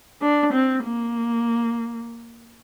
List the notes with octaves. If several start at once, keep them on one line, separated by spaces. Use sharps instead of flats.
D4
C4
A#3